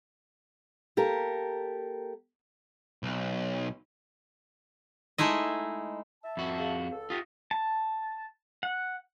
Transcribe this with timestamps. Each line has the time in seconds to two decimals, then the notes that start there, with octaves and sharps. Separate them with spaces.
0.97 A#3 G4 A4 A#4
3.03 B1
5.18 G#3 A3 D#4 E4 D#5
6.24 E5 A5
6.37 F2 F#4 B5
6.58 G#4 F5
6.91 C#2 A4
7.10 F4 G4 D#6 A#6 C#7
7.51 A5
8.63 F#5